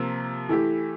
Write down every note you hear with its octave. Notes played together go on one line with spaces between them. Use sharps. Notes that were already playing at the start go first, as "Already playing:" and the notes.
Already playing: C3 F3 A#3
E3 A3 E4 G4